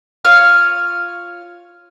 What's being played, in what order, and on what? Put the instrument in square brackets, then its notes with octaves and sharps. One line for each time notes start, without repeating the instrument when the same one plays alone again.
[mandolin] F4 C#5 F6